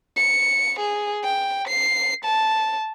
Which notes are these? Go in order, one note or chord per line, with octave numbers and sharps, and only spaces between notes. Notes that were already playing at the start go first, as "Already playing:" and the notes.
C#7
G#4
G5
C7
A5